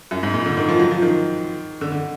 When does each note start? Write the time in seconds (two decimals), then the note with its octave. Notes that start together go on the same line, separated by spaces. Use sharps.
0.11 F#2
0.23 G#2
0.34 A#2
0.46 D3
0.57 D#3
0.68 F3
0.79 F#3
0.91 F3
1.02 D#3
1.81 D3
1.92 D3